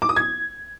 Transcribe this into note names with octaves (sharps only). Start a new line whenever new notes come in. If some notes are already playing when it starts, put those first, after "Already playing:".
D6
D#6
G#6